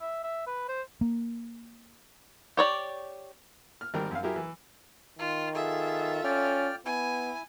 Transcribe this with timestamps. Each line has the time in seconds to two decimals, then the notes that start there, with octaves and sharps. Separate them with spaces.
0.01 E5
0.23 E5
0.47 B4
0.69 C5
1.01 A#3
2.57 G4 C#5 D5
3.81 F6
3.94 G#1 G3 A#4 G5
4.11 F#2 F5
4.23 F#3 E4 G4 G#4 A#4 E5
4.36 E3
5.19 D#3 F4
5.55 F4 G#4 A4 E5
6.24 C#4 D5 G5 F6
6.86 B3 E4 G#5